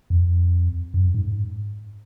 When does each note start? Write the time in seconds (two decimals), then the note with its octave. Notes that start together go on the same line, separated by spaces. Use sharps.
0.10 F2
0.94 F#2
1.14 G#2